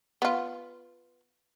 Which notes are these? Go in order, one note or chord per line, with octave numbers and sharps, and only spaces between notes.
B3 F4